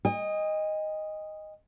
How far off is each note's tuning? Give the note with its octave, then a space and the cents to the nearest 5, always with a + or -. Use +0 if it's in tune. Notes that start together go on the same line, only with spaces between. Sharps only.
D#5 +0 G#5 -45